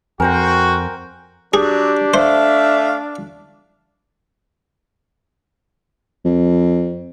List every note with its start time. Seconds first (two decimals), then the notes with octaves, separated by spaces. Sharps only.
0.20 F2 F#4 A#4 C5 G5 G#5
1.54 F#3 D4 G4 G#4
2.14 A3 C5 E5 F5
6.25 F2